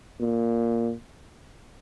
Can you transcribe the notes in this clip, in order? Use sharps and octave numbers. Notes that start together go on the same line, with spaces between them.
A#2